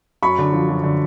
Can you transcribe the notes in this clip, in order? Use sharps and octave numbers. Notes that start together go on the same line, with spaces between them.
F#2 B5 C#6
D3
F3
F#2
D3